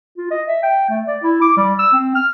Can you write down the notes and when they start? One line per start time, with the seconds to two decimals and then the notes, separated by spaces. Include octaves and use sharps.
0.17 F4
0.31 D#5
0.48 E5
0.63 G5
0.90 A3
1.07 D5
1.23 E4
1.42 D6
1.57 G3
1.79 E6
1.93 C4
2.15 F6